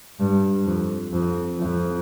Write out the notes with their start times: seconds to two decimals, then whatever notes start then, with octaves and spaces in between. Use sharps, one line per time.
0.20 G2
0.67 F2
1.13 F2
1.59 F2